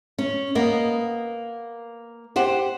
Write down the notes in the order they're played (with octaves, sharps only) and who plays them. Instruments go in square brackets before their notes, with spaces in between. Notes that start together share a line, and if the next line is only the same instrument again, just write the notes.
[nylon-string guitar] C#4
A#3 B3 D#5
G4 C5 F#5